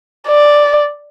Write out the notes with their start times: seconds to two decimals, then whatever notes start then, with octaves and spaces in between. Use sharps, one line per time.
0.28 D5